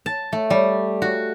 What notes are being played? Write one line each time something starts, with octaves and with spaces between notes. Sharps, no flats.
A5
A3
G3
F#4